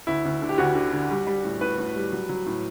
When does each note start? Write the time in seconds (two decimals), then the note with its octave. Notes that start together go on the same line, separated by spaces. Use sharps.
0.07 D2 E4
0.25 D2
0.42 D3
0.49 G4
0.58 D2 F#4
0.75 D3
0.92 D3
1.10 G3
1.27 G3
1.45 A2
1.61 A2 B4
1.78 A2
1.96 G3
2.12 F#3
2.29 F#3
2.46 A2